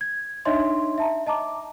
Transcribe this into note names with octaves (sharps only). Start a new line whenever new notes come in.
G#6
D4 D#4 C#5 D#5 E5 C6
E5 A5 A#5
D#5 A5 A#5 D6